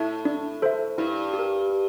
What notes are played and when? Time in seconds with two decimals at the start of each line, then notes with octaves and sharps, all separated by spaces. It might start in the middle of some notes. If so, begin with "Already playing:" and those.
Already playing: A2 E4 A4 E5 A5
0.25 D4
0.62 A4 C5 E5
0.98 G2 E4
1.33 G4
1.39 A#4
1.70 G4